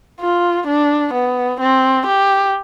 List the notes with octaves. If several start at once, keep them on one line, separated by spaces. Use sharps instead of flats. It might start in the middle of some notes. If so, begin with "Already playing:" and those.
F4
D4
B3
C4
G4